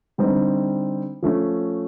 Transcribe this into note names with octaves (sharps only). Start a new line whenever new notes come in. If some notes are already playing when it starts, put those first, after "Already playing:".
D3 G3 C4 D#4
F3 A3 C#4